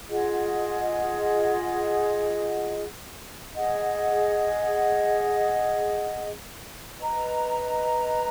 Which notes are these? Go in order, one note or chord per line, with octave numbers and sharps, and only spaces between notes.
F4 G#4 D#5 F#5
G#4 D#5 F#5
B4 D#5 A#5